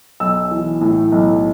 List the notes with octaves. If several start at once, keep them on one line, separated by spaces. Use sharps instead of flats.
B1 E6
E3
A2
B1